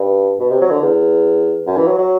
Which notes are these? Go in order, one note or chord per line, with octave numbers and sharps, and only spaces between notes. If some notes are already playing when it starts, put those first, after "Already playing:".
Already playing: G2
B2
C3
F#3
D3
E2
F#2
E3
F#3
F#3